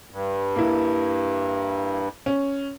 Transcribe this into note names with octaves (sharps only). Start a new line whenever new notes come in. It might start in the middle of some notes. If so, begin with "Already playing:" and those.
G2
A#3 E4
C#4